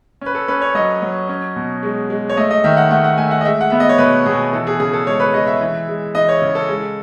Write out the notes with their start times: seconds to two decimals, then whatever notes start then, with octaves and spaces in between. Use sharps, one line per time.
0.21 C#4 B4
0.35 A4
0.48 C#4 B4
0.62 C#5
0.74 F#3 D#5
1.02 F#3
1.29 C#4
1.56 B2
1.83 G#3
2.10 G#3
2.30 C#5
2.37 A3 D#5
2.51 D#5
2.64 D#3 E5
2.77 F#5
2.91 A3 F#5
3.04 F#5
3.18 A3 G#5
3.27 E5
3.31 F#5
3.41 D#5
3.45 G#3 E5
3.61 F#5
3.70 B3 E5
3.80 D#5
3.89 C#5
3.98 B2 B4
4.26 B2 G#4
4.53 E3 A4
4.67 G#4
4.80 C#3 G#4
4.93 A4
5.07 G#3 C#5
5.20 B4
5.34 G#3 D#5
5.47 E5
5.61 E3
5.88 G#3
6.15 E3 D#5
6.29 C#5
6.42 C#3
6.55 A4
6.69 G#3